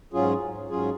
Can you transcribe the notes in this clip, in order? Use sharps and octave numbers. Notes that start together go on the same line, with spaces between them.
G#2 F#3 C#4 F4 G#4
G#2 F#3 C#4 F4 G#4